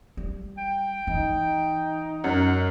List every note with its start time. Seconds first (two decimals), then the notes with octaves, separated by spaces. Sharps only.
0.17 G3
0.58 G5
1.07 E3 D#4
2.24 F#2 F#5